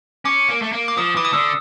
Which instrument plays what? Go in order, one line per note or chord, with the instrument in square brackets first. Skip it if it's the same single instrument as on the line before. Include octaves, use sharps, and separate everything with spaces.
[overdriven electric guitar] C#4 [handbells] D6
[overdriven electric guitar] A#3
A3
A#3
[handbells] D6
[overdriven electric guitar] F3 [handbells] D#6
[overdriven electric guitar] E3 [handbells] D6
[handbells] D#6
[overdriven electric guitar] D3 [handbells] E6